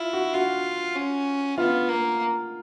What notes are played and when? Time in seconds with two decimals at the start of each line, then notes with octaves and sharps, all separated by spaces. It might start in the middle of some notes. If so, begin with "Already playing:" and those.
Already playing: E4 F4
0.13 F#4
0.34 F4 F#4
0.96 C#4
1.58 B3 F4
1.89 A#3